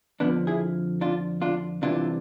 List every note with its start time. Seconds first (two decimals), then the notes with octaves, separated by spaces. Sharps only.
0.20 F2 D3 F3 B3 D4
0.47 E4 G#4
1.01 D4 F4
1.42 D4 F4
1.82 C2 C3 E3 D4 F4